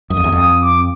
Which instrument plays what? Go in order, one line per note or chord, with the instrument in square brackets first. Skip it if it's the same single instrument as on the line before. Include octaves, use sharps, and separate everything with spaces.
[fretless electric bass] F#2 [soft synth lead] D#6
[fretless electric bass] F2
E2
[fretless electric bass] F2 [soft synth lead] D#6
[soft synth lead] D6